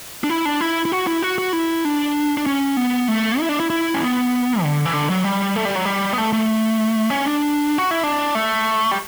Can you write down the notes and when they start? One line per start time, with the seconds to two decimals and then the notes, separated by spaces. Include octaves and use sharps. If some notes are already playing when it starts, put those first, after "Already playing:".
0.24 D4
0.29 E4
0.45 D4
0.61 E4
0.85 E4
0.92 F#4
1.07 E4
1.22 F#4
1.38 F#4
1.53 E4
1.85 D4
2.37 D4
2.46 C#4
2.77 B3
3.08 A3
3.40 E4
3.49 D4
3.60 E4
3.70 E4
3.94 C#4
4.01 B3
4.62 D3
4.85 E3
4.93 D3
5.10 F#3
5.24 G3
5.56 A3
5.65 G3
5.76 F#3
5.85 G3
6.13 B3
6.18 A3
6.33 A3
7.10 C#4
7.25 D4
7.78 F#4
7.91 E4
8.03 D4
8.35 A3
8.91 G3